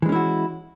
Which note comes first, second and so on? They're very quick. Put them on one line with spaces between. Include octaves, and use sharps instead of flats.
E3 G#3 C#4 E4 F#4